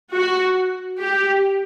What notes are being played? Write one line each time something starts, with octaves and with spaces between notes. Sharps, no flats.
F#4
G4